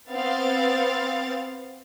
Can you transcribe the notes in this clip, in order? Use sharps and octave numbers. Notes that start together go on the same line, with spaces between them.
B3 C4 F5 A6